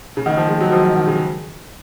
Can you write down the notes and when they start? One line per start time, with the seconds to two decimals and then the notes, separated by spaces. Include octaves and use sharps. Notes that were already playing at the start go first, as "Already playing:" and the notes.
0.17 C#3
0.26 D#3
0.37 F3
0.49 G#3
0.60 F#3
0.72 F3
0.84 D#3
0.95 D#3
1.07 C#3